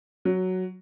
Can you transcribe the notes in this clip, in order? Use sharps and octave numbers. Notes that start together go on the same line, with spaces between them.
F#3